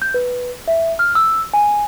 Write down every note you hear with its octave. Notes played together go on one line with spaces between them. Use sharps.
G6
B4
E5
F6
E6
G#5